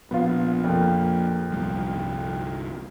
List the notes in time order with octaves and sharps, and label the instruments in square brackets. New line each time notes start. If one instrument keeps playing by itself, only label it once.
[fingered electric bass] A#1 [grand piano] B3 F4
[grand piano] F2 A#2
[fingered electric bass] G1 C2 G3